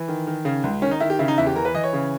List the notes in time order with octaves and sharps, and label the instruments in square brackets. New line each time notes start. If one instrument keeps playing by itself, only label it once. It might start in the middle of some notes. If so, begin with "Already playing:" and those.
Already playing: [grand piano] E3
D#3
D#3
C#3
C#2
D#3 C#4
D#4
D#3 E4
G4
C#3 E4
D#4
E2 E4
G4
E3 A#4
B4
E3 D#5
C#5
C#3